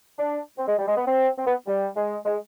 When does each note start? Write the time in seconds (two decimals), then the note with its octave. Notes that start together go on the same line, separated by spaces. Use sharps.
0.19 D4
0.58 C4
0.68 G#3
0.79 G3
0.88 G#3
0.97 B3
1.07 C4
1.37 C4
1.46 B3
1.67 G3
1.96 G#3
2.25 G#3